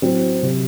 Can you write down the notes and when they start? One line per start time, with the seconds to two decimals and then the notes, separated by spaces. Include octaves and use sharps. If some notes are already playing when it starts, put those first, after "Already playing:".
0.02 A2 F#3 C4
0.43 C3 F#3